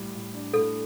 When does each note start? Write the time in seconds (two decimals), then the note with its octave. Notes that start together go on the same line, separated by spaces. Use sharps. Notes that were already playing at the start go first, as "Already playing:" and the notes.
Already playing: A2 G3
0.14 A2
0.34 D4
0.54 A2 A4